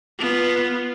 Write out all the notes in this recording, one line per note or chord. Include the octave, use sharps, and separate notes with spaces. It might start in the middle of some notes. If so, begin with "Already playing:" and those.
B3 F4